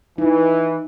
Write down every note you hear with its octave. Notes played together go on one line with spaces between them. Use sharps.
E3 D#4